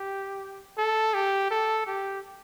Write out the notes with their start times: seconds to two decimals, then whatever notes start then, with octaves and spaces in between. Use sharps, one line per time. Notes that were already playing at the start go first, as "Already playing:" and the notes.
Already playing: G4
0.78 A4
1.14 G4
1.51 A4
1.87 G4